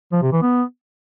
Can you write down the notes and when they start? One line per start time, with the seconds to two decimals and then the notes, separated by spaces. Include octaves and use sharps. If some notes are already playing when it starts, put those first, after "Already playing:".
0.12 F3
0.22 C3
0.32 E3
0.42 B3